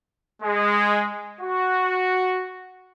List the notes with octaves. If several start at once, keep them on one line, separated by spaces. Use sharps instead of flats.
G#3
F#4